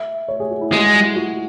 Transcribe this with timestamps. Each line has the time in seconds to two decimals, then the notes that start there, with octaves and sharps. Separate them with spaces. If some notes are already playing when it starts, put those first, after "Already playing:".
Already playing: E5
0.28 C#5
0.40 G#4
0.51 F#4
0.61 E4
0.72 G#3 F#4
0.94 E4
1.16 F#4